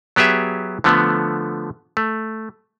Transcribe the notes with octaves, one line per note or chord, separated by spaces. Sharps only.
F#3 B3 G4 G#4 E5
D3 F3 A3 B3
A3